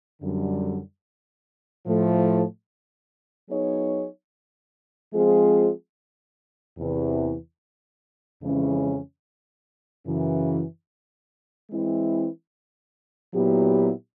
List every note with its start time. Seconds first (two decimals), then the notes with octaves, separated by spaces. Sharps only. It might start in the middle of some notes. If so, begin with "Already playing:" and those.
0.21 F#2 D3 G3
1.86 A2 F3 A3
3.49 F#3 B3 D#4 G#4 C#5
5.13 F3 G#3 C4 F4 G#4
6.78 E2 C3 E3
8.41 F2 C#3 E3 G#3 C#4
10.06 F#2 C#3 E3
11.70 E3 G#3 C4 E4
13.33 A#2 F#3 B3 E4 G4